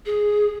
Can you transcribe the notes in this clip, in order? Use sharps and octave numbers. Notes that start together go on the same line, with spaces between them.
G#4